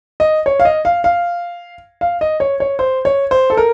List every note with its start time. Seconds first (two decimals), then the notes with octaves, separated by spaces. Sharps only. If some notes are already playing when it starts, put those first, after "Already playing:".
0.20 D#5
0.46 C#5
0.60 F5
0.65 D#5
0.85 F5
1.04 F5
2.01 F5
2.21 D#5
2.40 C#5
2.60 C#5
2.79 C5
3.05 C#5
3.31 C5
3.50 A4
3.57 A#4